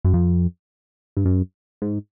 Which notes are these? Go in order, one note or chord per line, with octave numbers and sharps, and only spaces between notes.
F#2
F2
G2
F#2
G#2